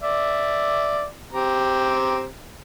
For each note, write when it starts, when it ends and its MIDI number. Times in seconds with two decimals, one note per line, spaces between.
0.03 1.05 74
0.03 1.05 76
1.32 2.25 60
1.32 2.25 67
1.32 2.25 82